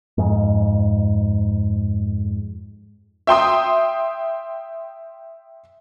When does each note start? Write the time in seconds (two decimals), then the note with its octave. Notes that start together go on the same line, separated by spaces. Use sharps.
0.18 F2 G#2
3.27 E5 G5 C6 D#6